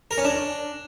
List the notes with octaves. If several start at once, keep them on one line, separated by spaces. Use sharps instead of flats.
A#4
C#4
D4